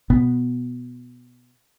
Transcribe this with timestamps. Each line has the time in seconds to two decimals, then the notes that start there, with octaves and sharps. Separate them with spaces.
0.10 B2 B3